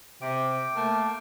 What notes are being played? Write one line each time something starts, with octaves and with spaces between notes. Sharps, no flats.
C3 G5 D6
A3 A#3